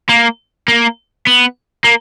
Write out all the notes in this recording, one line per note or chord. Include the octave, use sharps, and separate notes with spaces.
A#3
A#3
B3
A#3